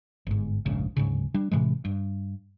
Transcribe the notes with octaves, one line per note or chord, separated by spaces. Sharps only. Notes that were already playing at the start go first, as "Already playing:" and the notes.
G1 G#2
F1 A#1 G#2 C#3
D1 G#2 C#3
G3 D4
A2 C3 E3 G#3
G2